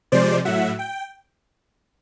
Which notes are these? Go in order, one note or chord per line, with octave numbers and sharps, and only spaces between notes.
C3 F3 G#3 C5 D5
A2 F#3 E5 F#5
G5